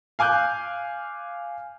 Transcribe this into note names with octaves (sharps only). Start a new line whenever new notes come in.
F5 G#5 D6 F#6 G6